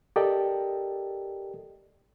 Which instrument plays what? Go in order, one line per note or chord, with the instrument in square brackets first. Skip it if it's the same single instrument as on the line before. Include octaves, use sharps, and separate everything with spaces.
[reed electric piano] G4 A4 A#4 D5 D#5 G5